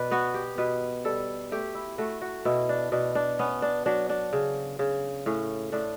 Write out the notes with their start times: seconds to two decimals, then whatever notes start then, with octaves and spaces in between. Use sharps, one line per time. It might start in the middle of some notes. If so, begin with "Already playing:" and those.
Already playing: B2 B4 D5
0.11 B3 F#4
0.34 G4
0.58 B2 B4
1.05 G3 A4
1.52 A3 G4
1.75 E4
1.98 A3 F#4
2.21 F#4
2.45 B2 E4
2.69 D4
2.92 B2 D4
3.15 D4
3.39 B3 C#4
3.62 D4
3.86 F#3 D4
4.09 D4
4.33 C#3
4.79 C#3
5.26 A2 C#4
5.72 A2 D4